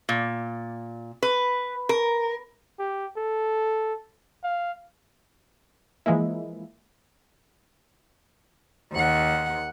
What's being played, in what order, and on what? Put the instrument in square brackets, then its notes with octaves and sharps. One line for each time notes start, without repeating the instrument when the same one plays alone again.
[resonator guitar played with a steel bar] A#2
B4
A#4
[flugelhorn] G4
A4
F5
[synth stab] E3 F3 G#3 A#3 E4
[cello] D#2 F#5